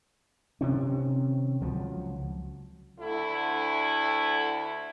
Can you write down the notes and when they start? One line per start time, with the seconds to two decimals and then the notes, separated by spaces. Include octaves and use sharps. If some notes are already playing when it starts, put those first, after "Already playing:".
0.61 C3 D#3 C4 C#4
1.61 C#2 F3 F#3
2.99 D2 D3 A3 E4